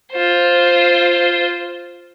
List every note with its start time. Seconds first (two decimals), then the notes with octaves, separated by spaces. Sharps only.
0.12 F4 C5